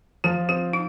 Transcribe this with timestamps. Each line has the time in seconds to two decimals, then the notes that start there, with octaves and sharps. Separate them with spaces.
0.24 F3 F4
0.49 C4 F4
0.73 D#4